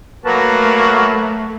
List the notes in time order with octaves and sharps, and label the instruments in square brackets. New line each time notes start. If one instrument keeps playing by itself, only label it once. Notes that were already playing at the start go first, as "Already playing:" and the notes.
[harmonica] F#3 A#3 F#4 [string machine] A3 [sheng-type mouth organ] A#4 B4 A5